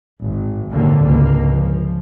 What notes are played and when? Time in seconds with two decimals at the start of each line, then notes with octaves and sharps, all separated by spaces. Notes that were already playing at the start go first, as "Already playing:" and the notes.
0.23 G#1
0.70 G#1 D#2 A#2 D3 A#3
1.04 C#2 A#3
1.51 F3